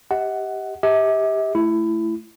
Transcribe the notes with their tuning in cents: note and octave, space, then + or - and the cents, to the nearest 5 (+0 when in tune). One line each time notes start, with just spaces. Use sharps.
G4 +0 D#5 +40 F#5 +10
G4 +10 E5 -45
A3 +0 E4 +15